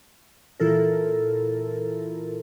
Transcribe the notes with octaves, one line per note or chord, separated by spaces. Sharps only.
A#2 E3 E4 F4 A4 A#4